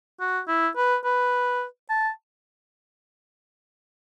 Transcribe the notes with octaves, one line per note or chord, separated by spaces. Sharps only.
F#4
E4
B4
B4
A5